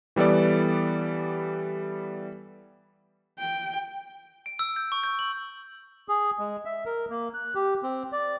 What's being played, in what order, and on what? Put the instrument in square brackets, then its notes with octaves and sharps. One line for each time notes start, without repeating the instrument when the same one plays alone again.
[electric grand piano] E3 G3 B3 A4 D5
[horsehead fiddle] G5
[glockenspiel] D7
E6
G6
C#6
G6
F#7
[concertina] G#4
G#3
E5
A#4
A#3
F#6
G4
C4
D5